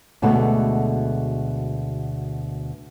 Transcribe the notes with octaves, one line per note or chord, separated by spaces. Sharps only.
D2 B2 G#3 A4 F#5